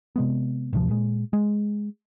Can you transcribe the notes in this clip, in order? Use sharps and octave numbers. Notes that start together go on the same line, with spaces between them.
C3 G#3 B3
A1 D2 C3 F3
A#2 G#3
G#3